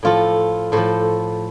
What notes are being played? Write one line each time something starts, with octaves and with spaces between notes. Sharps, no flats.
A2 F3 F4 A4
A2 F3 A4 C5